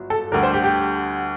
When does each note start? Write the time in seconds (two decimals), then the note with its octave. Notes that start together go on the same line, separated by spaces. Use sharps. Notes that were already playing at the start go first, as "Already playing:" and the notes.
Already playing: G1 F#3
0.10 A4
0.32 D2 D3 G3 A#4
0.43 C5
0.53 G4
0.64 G4